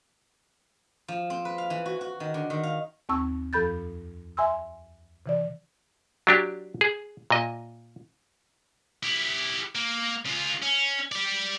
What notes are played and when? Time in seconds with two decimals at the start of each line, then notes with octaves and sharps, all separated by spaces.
1.08 F3
1.30 C4
1.45 B4
1.58 F5
1.70 E3
1.86 F#4
2.01 F#4
2.20 D#3
2.34 D3
2.50 D#3
2.63 F5
3.09 D#2 C4 A5 C#6 E6
3.53 F2 F3 A4 B5 G6 A6
4.37 E5 G#5 C6 E6
5.26 C3 E3 D5
6.27 F#3 D4 G4
6.81 G#4
7.30 A#2 D#5
9.03 E4 G4
9.75 A#3
10.25 C#3 F4
10.62 C#4
11.12 G4 D5